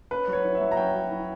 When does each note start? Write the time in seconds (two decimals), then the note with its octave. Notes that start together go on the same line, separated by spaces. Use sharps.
0.11 C#4 B4
0.28 F#3
0.33 C#5
0.44 E4
0.55 E5
0.61 F#3
0.71 A#5
0.77 C#4 G5
0.94 F#3
1.11 E4